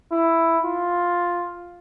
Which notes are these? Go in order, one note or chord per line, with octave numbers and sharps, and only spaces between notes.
E4
F4